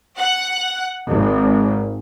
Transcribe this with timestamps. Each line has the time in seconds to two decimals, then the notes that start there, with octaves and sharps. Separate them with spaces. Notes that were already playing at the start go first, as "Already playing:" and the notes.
0.18 F#5
1.08 G#1